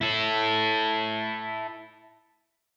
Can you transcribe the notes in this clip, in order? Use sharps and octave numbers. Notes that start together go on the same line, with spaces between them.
E4 A4